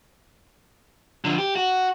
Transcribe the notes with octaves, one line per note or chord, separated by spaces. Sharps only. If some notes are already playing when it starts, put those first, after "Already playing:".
D3 F3
G4
F#4